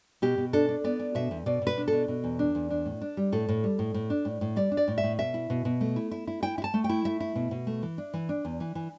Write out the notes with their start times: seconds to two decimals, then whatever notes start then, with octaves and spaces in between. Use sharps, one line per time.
0.22 B2 G4
0.38 B2
0.53 D4 A4
0.69 D4
0.84 B3 D5
1.00 D4
1.15 B2 E5
1.31 E2
1.46 B2 D5
1.62 B2
1.67 B4
1.78 D4
1.88 B2 A4
2.08 B2
2.24 E2
2.39 D4
2.55 E2
2.71 D4
2.85 A2
3.01 D4
3.17 G3
3.32 A2 A4
3.49 A2
3.64 G3
3.79 A2
3.94 A2
4.10 D4
4.25 A2
4.41 A2
4.56 G3 D5
4.72 D4
4.77 D5
4.88 A2
4.98 E5
5.03 A2
5.19 B2 E5
5.34 E4
5.50 B2
5.65 B2
5.81 A3
5.96 E4
6.11 E4
6.27 E4
6.43 E4 G5
6.58 E4
6.64 A5
6.74 A3
6.84 G5
6.89 E4
7.05 A3 E5
7.20 E4
7.36 B2
7.51 B2
7.67 A3
7.82 E3
7.98 D4
8.14 E3
8.29 D4
8.45 E2
8.60 E3
8.75 E3